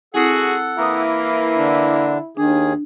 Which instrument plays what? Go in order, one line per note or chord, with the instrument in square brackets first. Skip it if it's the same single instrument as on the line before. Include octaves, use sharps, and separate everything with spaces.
[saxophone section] G#3 F#4 G#4 [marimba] C4 E4 [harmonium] A4 F#5
[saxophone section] E3 A#3 [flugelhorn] E4 [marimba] A#5 D#6
[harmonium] D3 D4
[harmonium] D#2 D#3 G#4 [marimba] D4